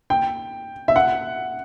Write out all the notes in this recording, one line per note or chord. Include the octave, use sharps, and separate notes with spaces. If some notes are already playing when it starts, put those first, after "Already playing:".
G5
E5
F#5